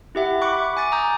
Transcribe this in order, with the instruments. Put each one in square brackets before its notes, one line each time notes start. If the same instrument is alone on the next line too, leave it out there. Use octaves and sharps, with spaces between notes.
[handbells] E4 G4 E5 F#5
B5 C#6 D6 F#6
G#5 D6 A6
A#5 D#6 G6